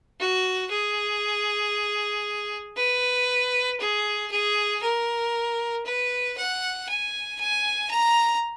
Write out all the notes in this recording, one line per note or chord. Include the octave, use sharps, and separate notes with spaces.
F#4
G#4
B4
G#4
G#4
A#4
B4
F#5
G#5
G#5
A#5